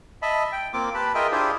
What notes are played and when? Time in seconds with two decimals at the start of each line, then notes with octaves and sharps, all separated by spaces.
0.22 D#5 E5 A5 B5
0.52 G5
0.73 A#3 C4 F4 D6
0.94 G4 B4 A5 B5
1.14 F4 G#4 A#4 D#5 E5 G5
1.32 D4 E4 F4 G4 G#4 C5